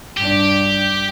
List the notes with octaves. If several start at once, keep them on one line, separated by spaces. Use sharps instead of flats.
G2 D4 G4